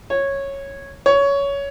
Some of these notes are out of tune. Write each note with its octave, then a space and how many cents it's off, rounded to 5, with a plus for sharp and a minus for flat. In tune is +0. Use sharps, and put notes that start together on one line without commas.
C#5 -10
C#5 +15